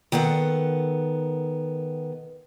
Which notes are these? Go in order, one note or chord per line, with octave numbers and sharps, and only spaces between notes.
D#3 B3 A4 F#5